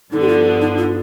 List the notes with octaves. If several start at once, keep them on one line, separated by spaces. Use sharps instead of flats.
G2 D3 F3 B3 D#4
G4
F4
D#4
F4